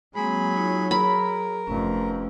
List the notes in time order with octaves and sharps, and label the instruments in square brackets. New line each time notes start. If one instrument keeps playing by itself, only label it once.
[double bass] F#3 [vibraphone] G#3 A#3 C4 [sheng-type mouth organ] G#4 B5
[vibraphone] D#4 F4 C#5
[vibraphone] G#4 [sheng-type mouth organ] A#4 [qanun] B5
[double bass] F1 F2 [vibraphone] C#4 B4